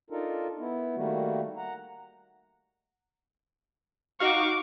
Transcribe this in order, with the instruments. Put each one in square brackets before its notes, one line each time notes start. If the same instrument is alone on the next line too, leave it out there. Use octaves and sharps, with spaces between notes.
[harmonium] D4 D#4 F4 A4 A#4
B3 E4
D#3 G3 A3 A#3 F#4
F#5 A#5
[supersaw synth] D#4 F#4 F5 [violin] C#6 D6